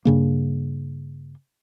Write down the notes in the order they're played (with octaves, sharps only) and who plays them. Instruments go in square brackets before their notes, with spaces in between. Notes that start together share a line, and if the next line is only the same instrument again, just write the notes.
[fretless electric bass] G2 C#3 A#3